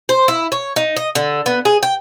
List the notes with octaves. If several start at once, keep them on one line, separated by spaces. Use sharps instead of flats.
C5
E4
C#5
D#4
D#5
D3
B3
G#4
G5